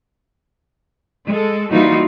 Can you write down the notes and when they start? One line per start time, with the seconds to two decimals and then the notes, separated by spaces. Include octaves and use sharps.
1.27 G#3 A4
1.71 E3 G3 A#3 D#4 F4 F#4